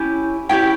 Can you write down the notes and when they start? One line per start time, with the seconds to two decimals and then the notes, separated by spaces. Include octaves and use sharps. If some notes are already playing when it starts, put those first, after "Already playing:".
Already playing: C#4 E4 G4 G#5
0.49 C#4 E4 G4 G5